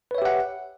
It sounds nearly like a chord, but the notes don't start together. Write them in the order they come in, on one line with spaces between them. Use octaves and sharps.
B4 C#5 E5 G4 F#5